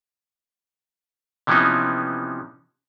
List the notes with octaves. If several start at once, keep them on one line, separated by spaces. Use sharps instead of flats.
C3 E3 F3 B3 C#4 D#4